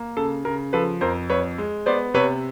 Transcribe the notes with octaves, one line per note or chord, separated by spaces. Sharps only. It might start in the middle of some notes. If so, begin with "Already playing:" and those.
Already playing: A#3
C#3 A4
C#3 A#4
F3 A4 B4
F2 A#4 C5
F2 B4 C#5
G#3
B3 C5 D5
C3 B4 C#5